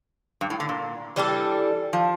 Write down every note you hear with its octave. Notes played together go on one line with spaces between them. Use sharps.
G2
A2
D3
A#2
E3 G3 D4 A4
F3